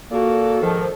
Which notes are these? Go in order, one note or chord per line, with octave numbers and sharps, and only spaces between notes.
A#2 A#3 F#4 A4
G#2 D#3 F3